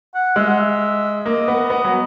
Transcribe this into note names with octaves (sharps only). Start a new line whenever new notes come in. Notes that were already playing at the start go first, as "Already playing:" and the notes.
F#5
G#3 E5
F#5
E5
A#3 D#5
B3
B3
F#3